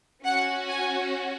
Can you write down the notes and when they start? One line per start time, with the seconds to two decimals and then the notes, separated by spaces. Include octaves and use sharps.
0.24 C#4 F#4 F#5
0.68 G#5